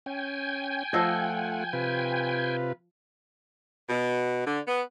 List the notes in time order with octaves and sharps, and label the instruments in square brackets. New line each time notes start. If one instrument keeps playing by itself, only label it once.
[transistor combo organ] C#4 [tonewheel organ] G5 G#5
[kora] F3 A4 D#5 [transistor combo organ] A3 F4 F#5
[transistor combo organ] C3 F4 B4
[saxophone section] B2
D3
B3